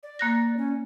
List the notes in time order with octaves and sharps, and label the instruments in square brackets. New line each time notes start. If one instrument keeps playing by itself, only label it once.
[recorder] D5
[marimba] A#3 F#6 A#6
[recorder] C#4